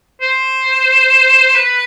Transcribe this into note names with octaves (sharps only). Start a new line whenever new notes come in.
C5
B4